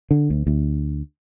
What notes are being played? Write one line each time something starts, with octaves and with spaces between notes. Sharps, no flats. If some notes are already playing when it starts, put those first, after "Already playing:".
D3
D2
D2